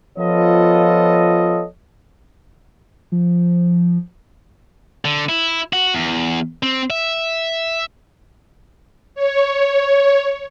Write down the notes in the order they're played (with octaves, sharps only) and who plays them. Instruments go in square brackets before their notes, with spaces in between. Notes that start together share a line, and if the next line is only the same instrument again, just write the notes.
[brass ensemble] F3 B3 F4 A4 C#5 D#5
[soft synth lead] F3
[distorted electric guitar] D3
E4
F#4
E2
C4
E5
[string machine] C#5